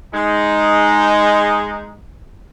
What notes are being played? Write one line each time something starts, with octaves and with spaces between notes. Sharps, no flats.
G#3 D#4